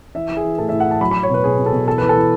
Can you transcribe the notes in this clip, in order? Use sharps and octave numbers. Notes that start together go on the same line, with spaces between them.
E3 E5
E3
G#4
E3
A2 A4
E5
A2
F#5
A2 A5
F#3 B5
B5
F#3
C#5
B2 B4
B2 G#4
B2
A4
B2
E3 A4
B4
E3
A4
E3